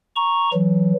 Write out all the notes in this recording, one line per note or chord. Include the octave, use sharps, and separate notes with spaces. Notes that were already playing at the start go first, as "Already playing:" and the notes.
A#5 C#6
E3 F#3